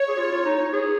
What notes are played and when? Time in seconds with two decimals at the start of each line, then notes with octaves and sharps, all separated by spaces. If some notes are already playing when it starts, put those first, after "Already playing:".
Already playing: C#5
0.08 G#4
0.18 F4
0.32 F4
0.45 D#4
0.59 D#4
0.73 G#4